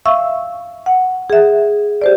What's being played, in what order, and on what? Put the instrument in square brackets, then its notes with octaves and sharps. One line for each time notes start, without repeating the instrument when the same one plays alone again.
[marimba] E5 F5 C#6 E6
F#5
G#4 E5
G4 C5 D5